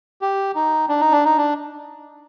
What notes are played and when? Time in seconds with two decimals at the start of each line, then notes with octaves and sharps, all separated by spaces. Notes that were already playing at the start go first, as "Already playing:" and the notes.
0.21 G4
0.55 D#4
0.89 D4
1.01 D#4
1.12 D4
1.25 D#4
1.37 D4